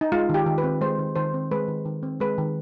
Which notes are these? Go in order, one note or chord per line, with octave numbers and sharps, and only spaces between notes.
D#4
G#3 F4
D#3 G4
D#3
B4
C4
G#3 C5
D#3
D#3 C5
C4
G#3 B4
D#3
D#3
C4
G#3 B4
D#3